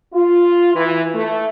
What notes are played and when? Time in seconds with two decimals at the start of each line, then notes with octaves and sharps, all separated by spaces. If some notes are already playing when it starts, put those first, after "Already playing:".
0.14 F4
0.75 E3
1.15 A3